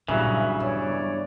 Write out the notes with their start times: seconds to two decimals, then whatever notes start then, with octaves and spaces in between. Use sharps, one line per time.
0.08 G2 A#2 C#3 E3 F#3 E5
0.60 B3 C#5 D5